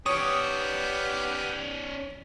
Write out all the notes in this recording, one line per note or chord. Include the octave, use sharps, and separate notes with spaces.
B3 C#4 G4 C#5 D5 D#6